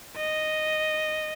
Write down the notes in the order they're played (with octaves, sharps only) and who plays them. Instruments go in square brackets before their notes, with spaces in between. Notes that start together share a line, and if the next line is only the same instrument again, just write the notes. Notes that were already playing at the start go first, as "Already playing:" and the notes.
[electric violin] D#5